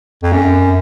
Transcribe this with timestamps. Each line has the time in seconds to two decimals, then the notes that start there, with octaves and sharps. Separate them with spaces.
0.23 F2
0.32 F#2